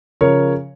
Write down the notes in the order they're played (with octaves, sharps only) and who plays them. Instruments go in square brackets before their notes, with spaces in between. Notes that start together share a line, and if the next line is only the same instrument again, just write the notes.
[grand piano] C#3 F3 A#4 C#5